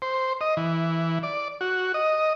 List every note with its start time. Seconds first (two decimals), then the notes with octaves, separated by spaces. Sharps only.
0.02 C5
0.41 D#5
0.57 E3
1.23 D5
1.61 F#4
1.94 D#5